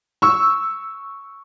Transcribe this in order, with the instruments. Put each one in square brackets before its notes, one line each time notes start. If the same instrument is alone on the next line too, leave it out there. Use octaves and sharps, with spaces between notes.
[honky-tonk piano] C#6 E6